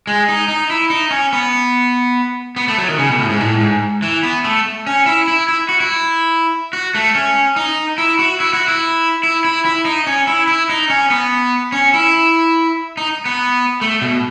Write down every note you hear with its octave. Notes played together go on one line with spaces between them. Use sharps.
G#3
D#4
D#4
E4
D#4
C#4
B3
B3
A3
F#3
D#3
C#3
B2
A2
G#2
A2
G#2
E3
B3
A3
C#4
E4
E4
E4
F#4
E4
F#4
A3
C#4
D#4
E4
F#4
E4
F#4
E4
E4
E4
E4
D#4
C#4
E4
E4
D#4
C#4
B3
C#4
E4
D#4
B3
A3
B2